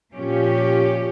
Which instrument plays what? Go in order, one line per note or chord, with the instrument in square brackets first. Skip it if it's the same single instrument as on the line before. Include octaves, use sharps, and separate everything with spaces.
[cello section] A#2 F3 C#4 G4